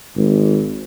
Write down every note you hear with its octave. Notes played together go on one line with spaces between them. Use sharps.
G#1